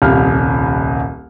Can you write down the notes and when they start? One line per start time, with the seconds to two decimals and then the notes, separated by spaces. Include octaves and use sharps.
0.02 D#1 C2 F5 F6